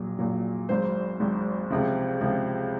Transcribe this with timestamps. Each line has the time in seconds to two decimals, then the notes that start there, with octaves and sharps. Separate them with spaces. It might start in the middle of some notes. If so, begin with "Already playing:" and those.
Already playing: A#1 A#2 F#3
0.19 A#1 A#2 F#3
0.69 G#1 G#2 F#3 C5
1.20 G#1 G#2 F#3
1.70 C#2 C3 F3
2.21 C#2 C3 F3